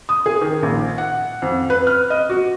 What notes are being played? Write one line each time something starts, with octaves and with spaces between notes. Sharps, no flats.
D#6
G#4
D#3
A#1
F#5
F2
B4
F6
D#5
F#4